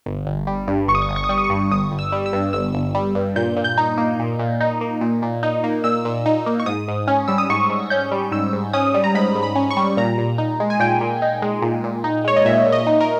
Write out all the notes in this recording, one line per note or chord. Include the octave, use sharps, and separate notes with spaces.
G1
G1
G3
G2
G1 C#6
D#6
C#6
G1 D#6
C#6
D#6
G3 C#6
D#6
C#6
G2
G1 D#6
G1
E6
G3
E6
G2
G1 E6
G1
G3
G2
A#2 G6
A#2
G6
D#4
A#3
A#2
A#2
D#4
A#3
A#2
A#2
D#4
A#3
A#2 E6
A#2
D#4
A#3
C#6
G#2 D#6
G#2
C#4
G3 E6
D#6
G#2 C#6
G#2
C#4 G6
G3
G#2 E6
G#2
C#4 D#6
G3
A#5
G#2 B5
G#2
B5
C#4
C#6
G3
A#2 A#5
A#2
D#4
G#3
G#5
A#2 G5
A#2
D#4
G#3
A#2
A#2
D#4
G#3 C#5
D#5
A#2 E5
A#2
D#5
D#4
A#4